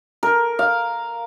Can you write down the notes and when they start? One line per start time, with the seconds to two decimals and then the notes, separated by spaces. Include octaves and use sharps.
0.23 A#4
0.59 F5